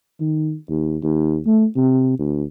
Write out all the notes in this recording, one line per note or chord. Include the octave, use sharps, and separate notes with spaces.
D#3
D#2
D#2
A3
C3
D2